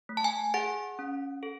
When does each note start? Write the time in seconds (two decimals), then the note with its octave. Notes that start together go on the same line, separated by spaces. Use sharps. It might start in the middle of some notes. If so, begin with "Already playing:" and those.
0.09 A3
0.17 A5
0.24 G#5
0.54 G#4 F#5
0.99 C#4
1.43 A4